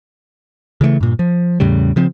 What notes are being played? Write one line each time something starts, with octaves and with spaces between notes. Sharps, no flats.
C#3 E3 G#3 A3
G2 A#2
F3
E2 A2 C#3 G3
C#3 F3 C4